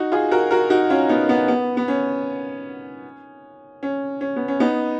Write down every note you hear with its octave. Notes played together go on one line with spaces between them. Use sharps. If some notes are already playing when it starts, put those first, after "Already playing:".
Already playing: D#4 F#4
F4 G#4
F#4 A#4
F#4 A#4
D#4 F#4
C#4 F4
B3 D#4
B3
B3
B3
C#4
C#4
C#4
B3
C#4
B3 D#4